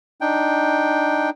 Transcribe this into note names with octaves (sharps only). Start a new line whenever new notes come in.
D4 D#4 G5